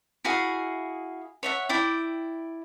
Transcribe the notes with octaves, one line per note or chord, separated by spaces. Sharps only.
E4 F#4 G#4 F5
C#5 E5 F#5
E4 D5 G5